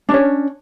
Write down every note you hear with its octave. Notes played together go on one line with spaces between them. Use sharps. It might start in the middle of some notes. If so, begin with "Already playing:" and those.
C#4 D4 C#5